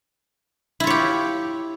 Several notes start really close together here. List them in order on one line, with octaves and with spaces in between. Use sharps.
E4 F4 C#5 G4